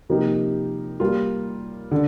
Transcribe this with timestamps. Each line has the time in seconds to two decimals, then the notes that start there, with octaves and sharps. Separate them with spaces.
0.09 C3 F3 A#3 D#4 G4
1.00 G3 A#3 F4
1.91 D3